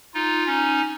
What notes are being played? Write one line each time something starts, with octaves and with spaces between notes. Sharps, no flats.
D#4 F4
C#4 D#4